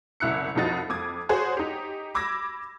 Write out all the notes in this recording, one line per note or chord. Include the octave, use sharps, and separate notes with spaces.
F#1 C2 E4 F#6 C#7
C2 F2 F3 D#4 F#4 A6
F2 D6 D#6 G#6
F#4 G#4 C5 C#5
D#4 G4
B5 D6 E6 G#6 A#6